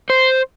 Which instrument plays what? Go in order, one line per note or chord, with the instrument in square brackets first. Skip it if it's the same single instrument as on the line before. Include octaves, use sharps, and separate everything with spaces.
[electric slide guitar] C5